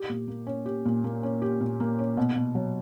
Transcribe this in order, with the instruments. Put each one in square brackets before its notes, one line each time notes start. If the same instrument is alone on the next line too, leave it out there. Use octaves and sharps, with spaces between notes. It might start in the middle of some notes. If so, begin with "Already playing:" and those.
Already playing: [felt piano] G4
A#2
A#3
C#4
G4
A#2
A#3
C#4
G4
A#2
A#3
C#4
B2
B2
F#3